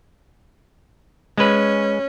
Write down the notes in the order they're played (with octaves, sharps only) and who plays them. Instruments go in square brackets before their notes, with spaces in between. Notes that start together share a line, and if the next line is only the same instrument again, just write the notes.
[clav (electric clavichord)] G#3 B4 [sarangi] C#4